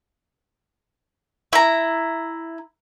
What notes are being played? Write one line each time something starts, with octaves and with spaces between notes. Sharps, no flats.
E4 A#5